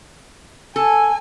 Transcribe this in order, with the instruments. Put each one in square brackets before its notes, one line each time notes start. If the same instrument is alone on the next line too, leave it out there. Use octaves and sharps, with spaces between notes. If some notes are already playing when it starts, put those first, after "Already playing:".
[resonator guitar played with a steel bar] A4 [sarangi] G#5